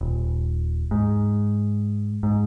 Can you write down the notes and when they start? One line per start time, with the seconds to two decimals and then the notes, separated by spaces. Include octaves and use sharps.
0.01 D#1
0.91 G#2
2.23 G#2